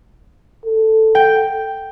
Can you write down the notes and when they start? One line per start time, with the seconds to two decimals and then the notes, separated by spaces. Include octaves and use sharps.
0.65 A4
1.15 G5